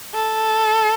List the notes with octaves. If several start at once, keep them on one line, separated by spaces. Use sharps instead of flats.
A4